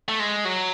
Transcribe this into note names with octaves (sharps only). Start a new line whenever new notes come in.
A3
G#3
F#3